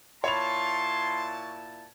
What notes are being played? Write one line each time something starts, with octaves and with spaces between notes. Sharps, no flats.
A#2 E4 C#5 A5 B5 C6 F7